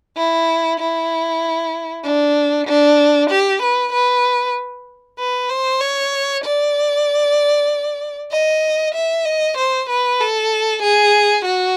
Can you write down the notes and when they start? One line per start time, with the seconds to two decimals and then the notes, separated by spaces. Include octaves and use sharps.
0.17 E4
0.80 E4
2.04 D4
2.67 D4
3.30 G4
3.62 B4
3.93 B4
5.19 B4
5.49 C5
5.80 C#5
6.44 D5
8.32 D#5
8.95 E5
9.25 D#5
9.57 C5
9.89 B4
10.21 A4
10.83 G#4
11.45 F#4